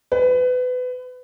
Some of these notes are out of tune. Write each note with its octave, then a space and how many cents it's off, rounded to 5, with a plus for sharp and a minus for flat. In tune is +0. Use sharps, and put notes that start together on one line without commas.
B4 +25